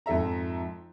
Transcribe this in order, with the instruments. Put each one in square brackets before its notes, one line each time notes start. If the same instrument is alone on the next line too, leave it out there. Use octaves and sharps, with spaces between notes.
[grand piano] F2 G#2 A4 E5 A#5